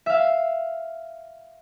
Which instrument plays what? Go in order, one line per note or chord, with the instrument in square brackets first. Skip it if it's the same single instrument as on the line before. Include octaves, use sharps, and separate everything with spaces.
[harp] E5 F5